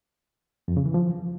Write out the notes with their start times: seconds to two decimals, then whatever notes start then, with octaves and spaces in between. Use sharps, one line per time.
0.68 F2
0.77 C#3
0.86 E3
0.94 F3